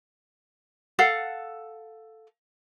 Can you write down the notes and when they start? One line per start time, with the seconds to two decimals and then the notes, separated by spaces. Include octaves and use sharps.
0.99 A4 F5 F#5